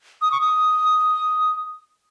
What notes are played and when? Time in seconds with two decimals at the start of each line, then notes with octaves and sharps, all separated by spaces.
0.22 D#6
0.32 C#6
0.41 D#6